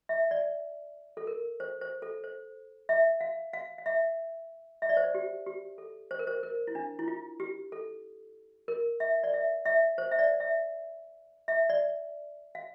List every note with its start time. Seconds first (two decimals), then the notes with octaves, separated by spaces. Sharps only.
0.09 E5
0.31 D5
1.17 A4
1.27 A#4
1.60 C5
1.81 C5
2.02 A4
2.24 C5
2.89 E5
3.21 F5
3.53 F5
3.78 F5
3.86 E5
4.82 E5
4.89 D5
4.97 C5
5.04 D5
5.15 G4
5.46 G4
5.78 A4
6.11 C5
6.19 A#4
6.27 C5
6.43 A#4
6.67 E4
6.75 D4
6.99 E4
7.08 F4
7.40 G4
7.72 A4
8.68 A#4
9.00 E5
9.24 D5
9.34 E5
9.65 E5
9.98 C5
10.11 E5
10.19 D5
10.40 E5
11.48 E5
11.70 D5
12.55 F5